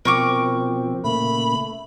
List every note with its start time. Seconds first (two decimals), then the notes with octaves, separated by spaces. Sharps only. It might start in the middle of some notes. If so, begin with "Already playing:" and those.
0.05 B2 F3 C4 A#4 C#6 D6
1.04 A#2 C#3 A3 A#3 B5